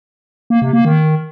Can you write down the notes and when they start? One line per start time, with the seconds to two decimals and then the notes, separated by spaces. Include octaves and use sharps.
0.50 A#3
0.62 C3
0.73 A#3
0.85 D#3